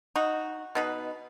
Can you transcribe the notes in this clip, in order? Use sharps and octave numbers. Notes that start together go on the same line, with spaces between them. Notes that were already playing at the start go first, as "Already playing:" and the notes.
D#4 F#4
B2 D#4 B4